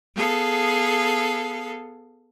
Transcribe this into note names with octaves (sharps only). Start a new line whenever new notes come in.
B3 G#4 A4 F5